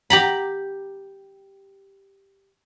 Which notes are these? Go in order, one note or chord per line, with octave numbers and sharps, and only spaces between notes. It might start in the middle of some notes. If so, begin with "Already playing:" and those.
G4 A#5 B5